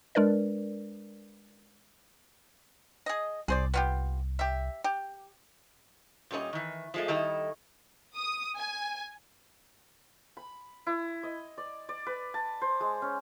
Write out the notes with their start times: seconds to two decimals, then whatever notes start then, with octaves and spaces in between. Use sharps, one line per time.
0.15 G#3 D4 A#4 B4 D5
3.06 G#4 D#5
3.48 C2 G#4 C5 D5
3.74 B3 F4 G4
4.39 G4 E5
4.84 G4
6.31 A#2 G3 C#4 B4 D#5
6.53 D#3 E3
6.94 F3 G#3 A3
7.08 D#3 G3 E4 A4 D#5
8.15 D#6
8.57 G#5
10.37 B5
10.87 E4
11.23 D#5
11.58 D5
11.89 D5
12.06 B4
12.34 A5
12.62 C5
12.80 G#3
13.02 C#4